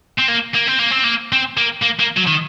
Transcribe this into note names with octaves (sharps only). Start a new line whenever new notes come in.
C4
A#3
A#3
C4
A#3
C4
A#3
C4
A#3
A#3
A#3
F#3
D#3